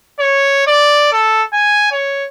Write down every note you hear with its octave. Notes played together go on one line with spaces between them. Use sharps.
C#5
D5
A4
G#5
C#5